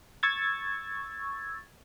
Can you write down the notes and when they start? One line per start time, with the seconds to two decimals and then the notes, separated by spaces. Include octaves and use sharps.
0.23 C#6 E6 G#6 A6